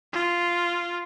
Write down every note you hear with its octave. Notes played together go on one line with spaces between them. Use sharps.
F4